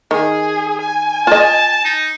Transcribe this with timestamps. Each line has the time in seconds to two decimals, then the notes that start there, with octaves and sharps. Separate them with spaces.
0.11 D#3 G#4
0.82 G#5
1.27 F4 D#5 A5
1.85 D#4